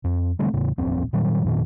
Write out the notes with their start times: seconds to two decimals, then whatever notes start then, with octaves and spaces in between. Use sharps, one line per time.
0.04 F2
0.39 D3 G3 A3 C4
0.53 E2 A2 C#3
0.78 D#1 A1 F2 C4
1.13 A#2 D#3 F#3 G3
1.44 F2 A#2 D#3